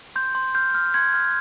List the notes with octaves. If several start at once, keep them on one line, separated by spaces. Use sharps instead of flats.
C6 G6
C6
F6 G6
F6
C6 G#6
F6